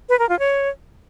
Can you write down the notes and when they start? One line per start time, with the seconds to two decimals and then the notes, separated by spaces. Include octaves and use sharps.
0.09 B4
0.19 A#4
0.29 F4
0.39 C#5